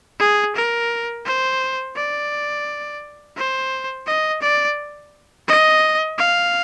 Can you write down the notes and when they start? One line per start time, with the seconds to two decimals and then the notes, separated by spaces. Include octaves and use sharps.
0.19 G#4
0.56 A#4
1.26 C5
1.96 D5
3.37 C5
4.07 D#5
4.42 D5
5.48 D#5
6.18 F5